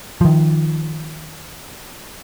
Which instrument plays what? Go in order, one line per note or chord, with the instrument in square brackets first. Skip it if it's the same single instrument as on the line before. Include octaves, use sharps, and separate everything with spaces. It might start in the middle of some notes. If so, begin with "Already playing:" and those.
[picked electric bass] D#3 F3